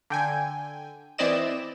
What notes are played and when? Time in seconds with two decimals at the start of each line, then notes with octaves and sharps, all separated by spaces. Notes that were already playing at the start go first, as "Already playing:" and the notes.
0.10 D3 G5 G#5
1.18 E3 C4 E4 D5 D#5 E7